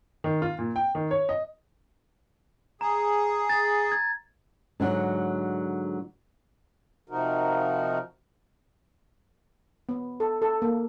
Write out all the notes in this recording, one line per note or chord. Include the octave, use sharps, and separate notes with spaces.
D#3
F4
A#2
G5
D#3
C#5
D#5
G#4 A#5
A6
G#6
G#2 D3 F#3
C3 F3 D#4 F#4 A#4
B3
A4
A4
A#3